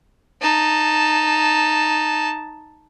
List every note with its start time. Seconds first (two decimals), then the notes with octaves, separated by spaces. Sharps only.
0.41 D#4 A5